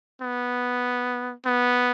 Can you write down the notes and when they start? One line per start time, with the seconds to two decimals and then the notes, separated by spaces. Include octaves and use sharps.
0.22 B3
1.46 B3